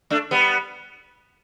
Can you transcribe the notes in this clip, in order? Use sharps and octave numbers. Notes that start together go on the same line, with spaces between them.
A3 D4
G3 B3